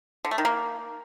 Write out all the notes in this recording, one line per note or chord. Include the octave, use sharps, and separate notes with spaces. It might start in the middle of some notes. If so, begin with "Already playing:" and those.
D3
A3
D#3
A#3